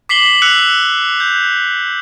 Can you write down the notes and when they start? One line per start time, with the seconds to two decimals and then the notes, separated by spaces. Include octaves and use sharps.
0.09 D6 B6 C7 F#7 G7
0.42 E6 F#6 C#7 F7
1.20 G6